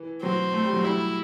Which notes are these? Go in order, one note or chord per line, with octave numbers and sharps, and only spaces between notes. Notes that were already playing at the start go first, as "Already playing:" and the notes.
Already playing: E3
F#3 C4
A3
G3
F#3
G3 E4